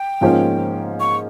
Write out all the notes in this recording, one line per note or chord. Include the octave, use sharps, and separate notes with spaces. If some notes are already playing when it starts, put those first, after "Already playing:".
Already playing: G5
G#2 F3 A#3 C#4
C#6